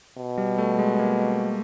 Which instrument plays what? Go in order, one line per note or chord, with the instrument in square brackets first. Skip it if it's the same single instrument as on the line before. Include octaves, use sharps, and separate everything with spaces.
[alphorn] B2
[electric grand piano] G3
A3
G#3
A#3